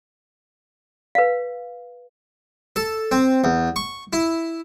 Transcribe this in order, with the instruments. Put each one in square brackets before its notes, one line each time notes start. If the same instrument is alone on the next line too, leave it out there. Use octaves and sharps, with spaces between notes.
[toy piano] B4 F5
[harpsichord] A4
C4
E2
C#6
E4